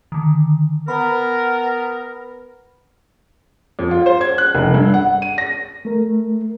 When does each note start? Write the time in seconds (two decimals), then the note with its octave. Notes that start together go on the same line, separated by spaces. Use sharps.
0.12 D3 D#3
0.88 B3 A#4 B5
3.79 F2
3.91 F4
4.06 C5
4.21 G#6
4.38 F#6
4.55 F1
4.74 G2
4.94 F#5
5.22 D#7
5.38 A#6
5.85 A3 A#4